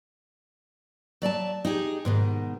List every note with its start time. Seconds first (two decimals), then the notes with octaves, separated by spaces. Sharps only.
1.22 F#3 D5 E5 A5
1.65 D#4 G4 G#4
2.05 G#2 B2 D#3